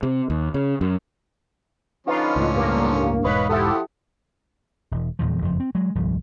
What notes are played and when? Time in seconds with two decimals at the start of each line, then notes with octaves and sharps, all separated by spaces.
0.03 C3
0.30 D#2
0.54 C#3
0.81 F#2
2.07 D3 F3 C#4 D#4 F4 B4
2.36 C#2 A2
2.55 G2 A#3
3.24 E1 G#2 B4 C#5 D#5 F5 B5
3.49 F3 E4 G4 A4 F#5 D#6
4.91 E1
5.19 D#1 E2 A#2 F3
5.42 F#1 F2 F3
5.60 C4
5.75 F#3 G#3
5.95 D#1 C2 G2 F3